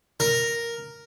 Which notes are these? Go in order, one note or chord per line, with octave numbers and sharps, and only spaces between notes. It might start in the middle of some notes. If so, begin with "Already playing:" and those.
A#4